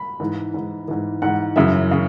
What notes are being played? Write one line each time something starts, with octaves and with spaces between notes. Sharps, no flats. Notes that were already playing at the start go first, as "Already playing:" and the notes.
Already playing: B5
G#2 E3
G#2 E3
G#2 E3
G#2 E3 F#5
F#2 C#3 E3 E5
C#3